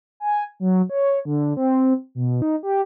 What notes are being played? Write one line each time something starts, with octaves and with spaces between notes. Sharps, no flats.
G#5
F#3
C#5
D3
C4
B2
D#4
G4